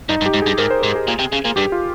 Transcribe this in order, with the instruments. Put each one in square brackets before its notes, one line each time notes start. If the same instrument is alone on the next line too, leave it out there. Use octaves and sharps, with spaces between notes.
[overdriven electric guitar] G2 [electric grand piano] D#4
[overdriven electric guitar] G2
[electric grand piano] G4
[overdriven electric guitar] G#2
[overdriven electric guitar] G2 [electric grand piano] G#4
[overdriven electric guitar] G#2 [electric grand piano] A#4
[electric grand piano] C5
[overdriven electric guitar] G#2 [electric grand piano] C5
[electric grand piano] G#4
[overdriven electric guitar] A#2
C3
C#3
A#2
[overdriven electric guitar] G2 [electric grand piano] G4
[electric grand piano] F4